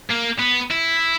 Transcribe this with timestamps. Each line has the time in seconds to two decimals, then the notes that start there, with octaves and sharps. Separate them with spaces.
0.10 A#3
0.39 B3
0.71 E4